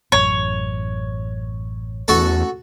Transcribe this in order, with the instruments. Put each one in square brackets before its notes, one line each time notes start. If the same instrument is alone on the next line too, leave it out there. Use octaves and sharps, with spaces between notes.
[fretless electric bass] A1 F#2 [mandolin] C#5
[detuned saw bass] E2 [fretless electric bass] A3 C#4 [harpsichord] F#4 A4